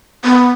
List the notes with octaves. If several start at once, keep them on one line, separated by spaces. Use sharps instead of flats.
B3